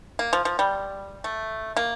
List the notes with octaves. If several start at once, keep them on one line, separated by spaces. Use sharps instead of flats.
A#3
F3
F3
G3
A3
A#3